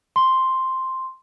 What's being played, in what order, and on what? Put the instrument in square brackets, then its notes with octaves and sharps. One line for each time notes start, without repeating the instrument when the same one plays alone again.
[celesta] C6